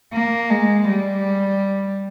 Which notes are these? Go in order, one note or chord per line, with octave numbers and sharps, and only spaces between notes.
A#3
G#3
G3